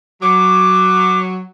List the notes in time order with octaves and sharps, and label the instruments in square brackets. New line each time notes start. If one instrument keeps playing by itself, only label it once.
[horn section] F#3 [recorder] D6